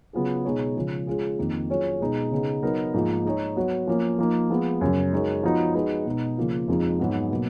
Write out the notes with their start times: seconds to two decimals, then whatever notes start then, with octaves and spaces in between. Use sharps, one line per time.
0.13 C#3 F#3 B3 F4 G#4
0.44 B2 G#3 D#4 G#4 C#5
0.76 C#3 F3 G#3
1.07 G#3 C#4 F4 G#4
1.38 F2 D#3 A#3 D#4
1.70 F#3 C#4 F4 G#4 C#5
2.01 B2 G#3 D#4
2.32 C#3 G#3 B3 D#4
2.63 F#3 B3 D#4 A#4
2.94 G#2 F3 A#3 D#4 G#4
3.25 G#3 D#4 G#4 C#5
3.56 F#3 B3 F#4 C#5
3.87 F3 A#3 C#4
4.18 F3 A#3 D#4
4.50 F3 G#3 B3
4.81 F#2 C#3 F#3
5.13 G#3 D#4 F#4 A#4 C#5
5.43 F3 B3 D#4 F#4
5.75 G#3 D#4 F#4 B4
6.06 B2 G#3 D#4
6.37 C#3 F3 A#3 F4
6.68 F2 F3 G#3 D#4
6.99 G#2 F#3 B3 F#4
7.31 B2 F#3 A#3